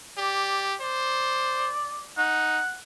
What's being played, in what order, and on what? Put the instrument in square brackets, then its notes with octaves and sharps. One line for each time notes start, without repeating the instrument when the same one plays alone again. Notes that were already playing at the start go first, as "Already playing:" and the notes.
[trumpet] G4 [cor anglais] D5
[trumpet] C5 [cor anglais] D5
[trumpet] D#4 [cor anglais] F#5